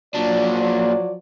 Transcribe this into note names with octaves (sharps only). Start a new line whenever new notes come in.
A#2 F3 F#3 D4 D5